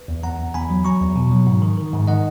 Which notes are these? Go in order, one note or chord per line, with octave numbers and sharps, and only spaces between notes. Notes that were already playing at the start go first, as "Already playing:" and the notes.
Already playing: B4
E2
E2 F#5 A#5
E2
E2 G#5 B5
F#3
F#3 A#5 C#6
E2
B2
F#3
G#2
D#3
D#3
G#2
D#3 D#5 F#5